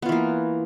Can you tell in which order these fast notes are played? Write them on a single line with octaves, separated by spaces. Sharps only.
B3 F4 E3 A#3